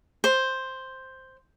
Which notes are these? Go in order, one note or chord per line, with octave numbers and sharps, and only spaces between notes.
C5